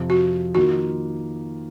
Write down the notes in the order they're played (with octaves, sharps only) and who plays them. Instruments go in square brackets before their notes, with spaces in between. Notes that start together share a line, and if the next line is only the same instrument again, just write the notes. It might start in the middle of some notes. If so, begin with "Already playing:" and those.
Already playing: [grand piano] F2 C3 F3
[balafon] F#4
[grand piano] D#3 A#3 F4 [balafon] F#4